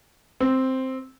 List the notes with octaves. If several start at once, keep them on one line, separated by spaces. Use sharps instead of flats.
C4